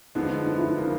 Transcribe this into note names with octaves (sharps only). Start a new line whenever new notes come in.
D3 F3 G#3 B3 D#4
D#4
E4
C#3 F3 A#3